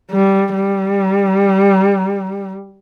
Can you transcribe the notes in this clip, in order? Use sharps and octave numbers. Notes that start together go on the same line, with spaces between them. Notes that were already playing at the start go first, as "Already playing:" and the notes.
G3
G3